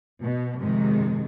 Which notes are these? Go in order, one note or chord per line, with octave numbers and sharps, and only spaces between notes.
B2
F2 G#2 C3 D#3 G#3